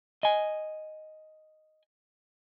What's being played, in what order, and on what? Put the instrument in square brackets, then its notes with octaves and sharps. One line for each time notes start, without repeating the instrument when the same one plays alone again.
[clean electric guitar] D#5 G#5